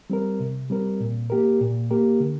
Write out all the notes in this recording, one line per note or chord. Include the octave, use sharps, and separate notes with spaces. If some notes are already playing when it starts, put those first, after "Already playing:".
G3 C4 A#4
C3
G3 C4 A#4
A#2
A#3 G4 A#4
A#2
A#3 G4 A#4
D3